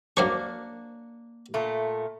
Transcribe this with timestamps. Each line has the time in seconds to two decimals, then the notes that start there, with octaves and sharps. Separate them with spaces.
0.17 F#2 A#3 D4 C5 C#6
1.54 A#2 A3